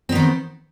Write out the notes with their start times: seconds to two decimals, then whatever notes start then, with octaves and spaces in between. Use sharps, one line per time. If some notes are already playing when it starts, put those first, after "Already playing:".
0.09 C4
0.12 B3
0.15 D#3